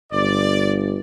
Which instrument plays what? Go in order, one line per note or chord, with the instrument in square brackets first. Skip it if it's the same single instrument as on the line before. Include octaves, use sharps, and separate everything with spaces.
[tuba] G1 [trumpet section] D5